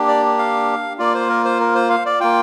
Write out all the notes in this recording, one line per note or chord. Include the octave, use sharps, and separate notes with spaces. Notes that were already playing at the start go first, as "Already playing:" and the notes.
Already playing: A#3 D4 G4
D5
F5
A#3 F4 D5
C5
A#4
C5
A#4
C5
F5
D5
A#3 F4 G5